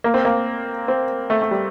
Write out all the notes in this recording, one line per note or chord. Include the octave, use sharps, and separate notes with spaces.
A#3
C4
A#3
C4
A3
A3
G3